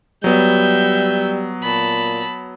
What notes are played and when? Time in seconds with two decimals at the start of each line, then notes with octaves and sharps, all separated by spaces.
0.24 F#3 G3 B3 E5 G6
1.63 A#2 A5 B5